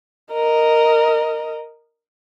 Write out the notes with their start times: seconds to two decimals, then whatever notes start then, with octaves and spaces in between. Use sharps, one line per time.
0.33 A#4 D#5